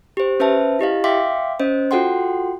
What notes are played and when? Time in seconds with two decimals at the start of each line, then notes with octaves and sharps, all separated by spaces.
0.17 G4 C5
0.40 C#4 B4 C5 E5 A5
0.79 E4 G4 D#5 F5
1.04 E5 F5 G5 C6 D6 B6
1.60 C#4 C5 D#5
1.91 F4 F#4 A4 F#5 G5 C6